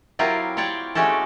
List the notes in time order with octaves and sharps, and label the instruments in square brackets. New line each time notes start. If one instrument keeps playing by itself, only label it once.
[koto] F#3 C4 E4 F4 G4 A#4
C4 G4 C#5 D5 G5
G#3 A3 C#4 F#4 G4 A4